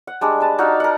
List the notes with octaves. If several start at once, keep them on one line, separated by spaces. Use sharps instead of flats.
F#5
G3 G#3 D4
B4 A5
D#4 F#4 D5 F5
A#4 F#5